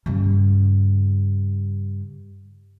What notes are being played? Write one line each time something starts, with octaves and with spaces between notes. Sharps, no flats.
G2 C#3